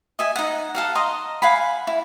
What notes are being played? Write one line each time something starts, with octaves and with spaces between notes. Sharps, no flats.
D#5 E5 G#5
D#4 F#5
A4 F5 F#5
D#5 A#5 C6
F5 F#5 G#5 B5
E4